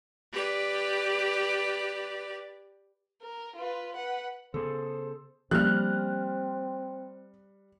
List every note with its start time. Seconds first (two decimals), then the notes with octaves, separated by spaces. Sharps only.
0.34 G4 B4 D5
3.22 A#4
3.56 F4 B4
3.96 B4 F#5
4.54 C#3 B3 G#4 A4 C5
5.51 F3 G3 A#3 C4 F6 F#6